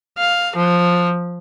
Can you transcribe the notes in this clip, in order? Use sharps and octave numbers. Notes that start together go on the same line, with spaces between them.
F5
F3